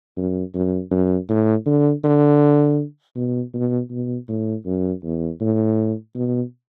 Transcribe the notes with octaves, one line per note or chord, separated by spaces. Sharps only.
F#2
F#2
F#2
A2
D3
D3
B2
B2
B2
A2
F#2
E2
A2
B2